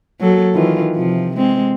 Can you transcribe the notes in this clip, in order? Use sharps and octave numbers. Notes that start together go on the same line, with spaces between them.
F#3 A#3 A4
D#3 E3 F4
C3 F3
G#3 C4